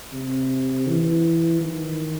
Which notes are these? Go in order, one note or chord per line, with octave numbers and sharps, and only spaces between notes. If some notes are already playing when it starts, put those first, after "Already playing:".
C3
E3
D#3